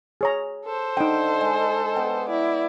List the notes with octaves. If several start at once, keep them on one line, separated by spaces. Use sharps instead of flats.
G#4 C#5 A#5
A4 C5
D3 D#4 D#5 G5
G#3
B3 G5
E4 D5